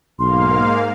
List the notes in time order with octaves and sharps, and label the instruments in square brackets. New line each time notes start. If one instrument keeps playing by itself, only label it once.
[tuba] B1 [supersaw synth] G#2 A#3 F5 [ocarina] C6